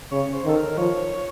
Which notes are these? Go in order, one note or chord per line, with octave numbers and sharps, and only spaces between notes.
C#3 C#5
C5
D#3 A4
A#4
F3 C#5